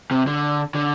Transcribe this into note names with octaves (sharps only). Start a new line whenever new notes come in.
C3
D3
D3